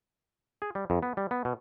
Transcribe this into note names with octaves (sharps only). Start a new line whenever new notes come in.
G#4
G3
F2
B3
G3
B3
B2